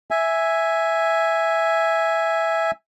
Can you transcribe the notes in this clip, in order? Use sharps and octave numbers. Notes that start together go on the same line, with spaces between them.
E5 G#5